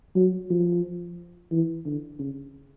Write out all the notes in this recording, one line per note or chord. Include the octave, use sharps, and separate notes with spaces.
F#3
F3
E3
D3
C#3